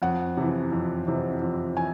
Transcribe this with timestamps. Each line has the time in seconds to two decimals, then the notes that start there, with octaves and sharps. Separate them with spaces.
0.02 F2 F#5
0.37 C3 E3
0.72 F2
1.07 C3 E3
1.42 F2
1.76 E3 G#5